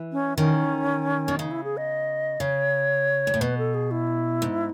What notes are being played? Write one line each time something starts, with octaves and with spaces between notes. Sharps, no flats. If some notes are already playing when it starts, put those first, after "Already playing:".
Already playing: E3
C#4
D#3 C#4
B2
C#3 D#4
E4
G#4
D#5
C#3 C#5
G#2
A2
B2 B4
A4
G#4
E4
G#2